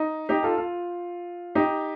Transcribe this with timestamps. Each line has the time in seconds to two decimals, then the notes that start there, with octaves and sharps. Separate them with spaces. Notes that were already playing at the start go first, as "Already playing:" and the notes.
Already playing: D#4
0.29 D#4 G4
0.43 F4 A4
0.58 F4
1.55 D#4 G4